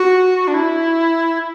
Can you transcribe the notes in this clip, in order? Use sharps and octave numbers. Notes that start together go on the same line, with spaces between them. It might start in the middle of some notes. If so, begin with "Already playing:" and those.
Already playing: F#4
D4
E4